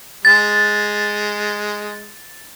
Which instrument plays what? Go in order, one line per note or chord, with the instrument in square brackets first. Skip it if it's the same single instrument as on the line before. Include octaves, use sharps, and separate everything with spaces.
[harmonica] G#3 [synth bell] A6